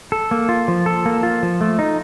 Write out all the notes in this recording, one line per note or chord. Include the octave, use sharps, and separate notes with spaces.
A4
A#3
F4
F3
A4
A#3
F4
F3
A3
D#4